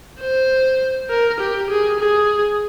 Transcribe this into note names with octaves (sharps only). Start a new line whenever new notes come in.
C5
A#4
G4
G#4
G#4